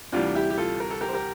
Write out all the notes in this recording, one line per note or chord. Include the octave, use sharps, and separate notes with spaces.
D2 C3 E3 G3 D4 F4
E4 G4
G4
F4 A4
A#4
A4
G4 A#4
C5
G4 A#4